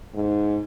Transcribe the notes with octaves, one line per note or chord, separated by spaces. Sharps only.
G#2